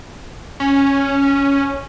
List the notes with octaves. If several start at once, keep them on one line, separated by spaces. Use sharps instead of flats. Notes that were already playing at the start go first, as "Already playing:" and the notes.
C#4